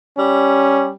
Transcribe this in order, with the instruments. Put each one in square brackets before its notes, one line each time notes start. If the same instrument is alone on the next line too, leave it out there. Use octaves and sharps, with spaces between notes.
[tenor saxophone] G3 [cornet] C#4